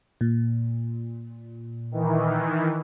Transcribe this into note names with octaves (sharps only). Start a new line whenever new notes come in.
A#2
D#3 E3